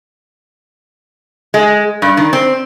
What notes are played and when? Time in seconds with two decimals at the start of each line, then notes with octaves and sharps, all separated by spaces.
1.54 G#3
2.02 G2
2.17 D#3
2.33 C4